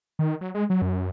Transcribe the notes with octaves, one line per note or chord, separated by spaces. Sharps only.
D#3
F#3
G#3
F#3
F#2